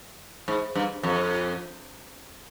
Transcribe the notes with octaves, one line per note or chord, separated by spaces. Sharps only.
G#2
G2
F2